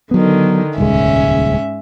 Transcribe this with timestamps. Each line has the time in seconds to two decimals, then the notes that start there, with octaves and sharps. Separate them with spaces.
0.11 D3 D#3 F#3 B3
0.78 D#1 C#2 G#2 G#3 C#4 E5